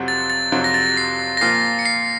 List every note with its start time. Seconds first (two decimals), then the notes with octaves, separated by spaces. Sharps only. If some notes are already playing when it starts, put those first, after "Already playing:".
Already playing: F2 C3 F#3 C4 F#4
0.08 A6
0.30 A6
0.52 F2 C3 F#3
0.64 A#6
0.74 A6
0.97 C7
1.37 A#6
1.41 A#2 F3 A#3 F4 C7
1.79 C#7
1.85 C7